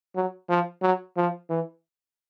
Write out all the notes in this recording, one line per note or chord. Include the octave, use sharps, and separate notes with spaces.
F#3
F3
F#3
F3
E3